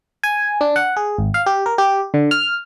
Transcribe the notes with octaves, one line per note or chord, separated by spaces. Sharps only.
G#5
D4
F#5
G#4
G#1
F5
G4
A#4
G4
D3
F6